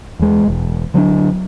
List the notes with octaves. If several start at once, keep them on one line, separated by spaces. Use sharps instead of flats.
E2 G#3
E1
D3 F#3 C#4 D4